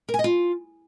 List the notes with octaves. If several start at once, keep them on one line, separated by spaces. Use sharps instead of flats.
A#4
G#5
D#5
F4